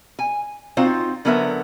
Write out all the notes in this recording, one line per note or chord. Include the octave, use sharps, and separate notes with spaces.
G#5
C4 D#4 F4 F#4 C5
D3 F#3 B3 A#4 B4 E5